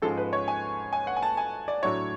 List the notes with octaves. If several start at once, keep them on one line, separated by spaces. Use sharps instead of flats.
G#2 F3 G#3 C#4 A4
B4
C#5
G#5
G#5
F#5
G#5
A5
G#5
D5
A2 F#3 A3 D4 C#5